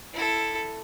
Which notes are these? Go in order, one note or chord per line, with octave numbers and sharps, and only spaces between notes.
E4 A4